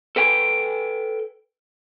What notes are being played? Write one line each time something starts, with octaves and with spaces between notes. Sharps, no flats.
A4 B4 G5 G#5